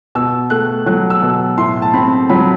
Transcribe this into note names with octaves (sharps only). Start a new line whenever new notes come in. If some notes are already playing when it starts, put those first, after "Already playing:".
B2 E6
A3 F#6
F#3 F#6
E6
B2
A2 C6
A5
C4 B5
F#3 B5